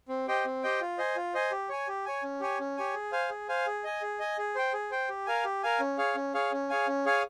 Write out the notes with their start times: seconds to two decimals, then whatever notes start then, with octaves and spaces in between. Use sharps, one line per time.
0.08 C4
0.28 G4 C5 D#5 G5
0.45 C4
0.63 G4 C5 D#5 G5
0.81 F4
0.98 C5 D#5 G#5
1.16 F4
1.34 C5 D#5 G#5
1.51 G4
1.69 C#5 G#5
1.88 G4
2.06 C#5 G#5
2.23 C#4
2.40 G4 C#5 G#5
2.60 C#4
2.77 G4 C#5 G#5
2.94 G#4
3.12 C5 F5 G#5
3.30 G#4
3.49 C5 F5 G#5
3.67 G#4
3.84 D#5 G#5
4.02 G#4
4.19 D#5 G#5
4.38 G#4
4.55 C5 G5
4.73 G#4
4.91 C5 G5
5.09 G4
5.26 A#4 F5 G#5
5.44 G4
5.63 A#4 F5 G#5
5.80 C#4
5.98 G#4 C#5 F5
6.15 C#4
6.34 G#4 C#5 F5
6.52 C#4
6.69 G#4 C#5 F5 G#5
6.87 C#4
7.06 G#4 C#5 F5 G#5